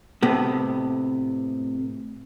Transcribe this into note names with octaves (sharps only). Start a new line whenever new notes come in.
A2 C3 B3